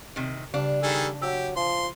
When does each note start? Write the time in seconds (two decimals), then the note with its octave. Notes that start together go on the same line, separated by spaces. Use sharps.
0.16 C3 D#3
0.54 C#3 G3 D4 F5
0.83 D#3 G3 G#4 A4
1.22 F#3 G4 E6
1.56 F3 C6